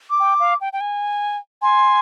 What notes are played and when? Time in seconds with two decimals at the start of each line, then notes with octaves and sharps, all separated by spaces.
0.10 D6
0.20 G5
0.40 F5
0.61 G5
0.73 G5
0.81 G#5
1.62 G#5 C6